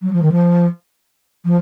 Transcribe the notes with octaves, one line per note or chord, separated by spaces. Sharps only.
F#3
F3
D#3
F3
F3